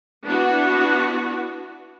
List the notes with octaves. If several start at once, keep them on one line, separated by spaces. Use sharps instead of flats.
B3 D4 E4 F#4